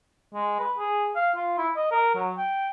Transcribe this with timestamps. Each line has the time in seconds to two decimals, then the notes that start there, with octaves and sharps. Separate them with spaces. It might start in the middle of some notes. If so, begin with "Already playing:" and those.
0.34 G#3
0.59 B4
0.78 G#4
1.16 F5
1.36 F4
1.58 E4
1.76 D#5
1.91 A#4
2.15 F#3
2.38 G5